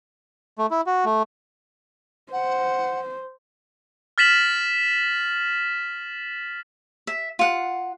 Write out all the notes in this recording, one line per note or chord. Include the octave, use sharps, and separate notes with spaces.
A3
E4
F#4
A3
C5 F#5
F6 A6 B6 E7 F#7
E5
F4 F#5